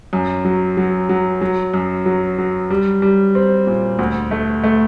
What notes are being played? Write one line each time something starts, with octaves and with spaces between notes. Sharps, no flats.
F#2
F#3
F#3
F#3
F#3
F#2
F#3
F#3
G3
G3
C4
A#2
D2
A3
A3